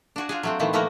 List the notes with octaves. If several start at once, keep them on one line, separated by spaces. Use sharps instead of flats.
D4 F#4 G#4
F4 F#4 G#4
F#3 A3 C4
A#2 D#3 E3 A3 B3
F3 A3 A#3 F#4 A#4